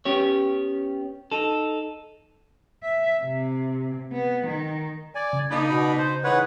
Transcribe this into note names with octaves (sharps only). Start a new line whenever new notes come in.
B3 C#4 G4 C#5
D#4 A4
E5
C3
B3
D#3
D5 G#5
C#3
A#3 D4 D#4 B5
B2 B5
C5
E3 G#3 D#4 B4 C#5 F#5